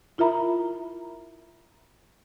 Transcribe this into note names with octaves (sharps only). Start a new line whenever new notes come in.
E4 F4 A#4 E5 A#5 B5